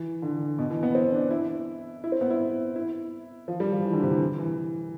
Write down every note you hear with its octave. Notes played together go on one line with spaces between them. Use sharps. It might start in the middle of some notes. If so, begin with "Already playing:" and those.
Already playing: E3
D3
B2
E3
B3
C4
D4
E4
E4
C4
B3
E4
E4
F3
G3
F3
E3
D3
C3
E3
E3